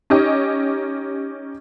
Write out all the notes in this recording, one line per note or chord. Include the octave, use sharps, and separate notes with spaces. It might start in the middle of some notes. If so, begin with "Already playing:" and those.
C#4 D#4 G4 D#5